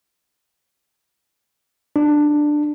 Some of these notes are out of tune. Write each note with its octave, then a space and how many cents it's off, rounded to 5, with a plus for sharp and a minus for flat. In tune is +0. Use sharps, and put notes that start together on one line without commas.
D4 +15